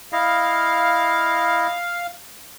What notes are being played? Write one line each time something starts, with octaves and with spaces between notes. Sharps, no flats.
E4 D#5 F5